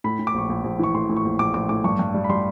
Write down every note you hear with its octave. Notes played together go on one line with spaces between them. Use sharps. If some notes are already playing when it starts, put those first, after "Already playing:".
A2 B5
A2
D6
A#1 C#6
A#1
A#1
E3 C#6
A2 C6
A2
C#6
A#1
A#1 D6
A#1 D6
A2 D6
G2 C#6
G2
G3
B5
G3 C6